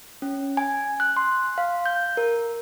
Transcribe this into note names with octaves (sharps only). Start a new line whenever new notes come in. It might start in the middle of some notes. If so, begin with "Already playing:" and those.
C#4
G#5
F#6
C6
F5
G6
A#4